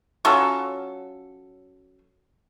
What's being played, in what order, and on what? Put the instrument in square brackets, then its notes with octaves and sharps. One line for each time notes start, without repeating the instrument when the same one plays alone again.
[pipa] F#3 C#4 F4 A4